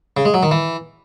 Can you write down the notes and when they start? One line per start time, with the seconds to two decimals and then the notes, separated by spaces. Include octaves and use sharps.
0.17 C#3
0.25 G#3
0.34 F#3
0.43 D#3
0.51 E3